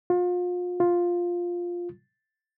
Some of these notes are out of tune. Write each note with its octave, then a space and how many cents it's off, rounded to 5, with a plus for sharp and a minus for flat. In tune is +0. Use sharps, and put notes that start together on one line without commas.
F4 +35
F4 +5